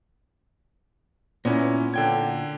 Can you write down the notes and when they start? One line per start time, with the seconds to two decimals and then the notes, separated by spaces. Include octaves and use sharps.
1.45 A#2 B3 C#4 E4
1.94 D3 G5 G#6